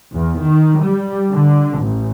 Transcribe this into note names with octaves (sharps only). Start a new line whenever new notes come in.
E2
D#3
G3
D3
A1